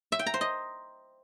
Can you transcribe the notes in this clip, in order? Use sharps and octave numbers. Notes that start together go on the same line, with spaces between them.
E5
G5
A#5
C5
D#5